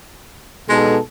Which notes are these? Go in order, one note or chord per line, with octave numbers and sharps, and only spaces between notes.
B2 G#3 D#4 A4